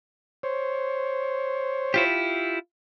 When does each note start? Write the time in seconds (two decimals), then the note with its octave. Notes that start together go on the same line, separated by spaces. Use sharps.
0.43 C5 C#5
1.94 E4 F4 G4